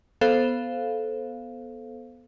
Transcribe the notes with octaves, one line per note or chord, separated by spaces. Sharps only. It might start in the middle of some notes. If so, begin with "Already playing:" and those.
B3 A4 C5 F5